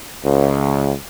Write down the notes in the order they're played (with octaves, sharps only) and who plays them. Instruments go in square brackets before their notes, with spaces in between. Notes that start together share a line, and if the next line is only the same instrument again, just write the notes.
[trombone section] C#2